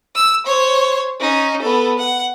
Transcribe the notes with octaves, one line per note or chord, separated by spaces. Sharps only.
E6
C5 C#5
C#4 D#4
B3 A4
F#5